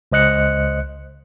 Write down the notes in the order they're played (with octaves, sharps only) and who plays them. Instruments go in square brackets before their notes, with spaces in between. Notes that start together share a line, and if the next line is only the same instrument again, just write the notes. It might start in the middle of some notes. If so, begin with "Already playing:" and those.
[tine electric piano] C#2 C5 D#5 F#6 C#7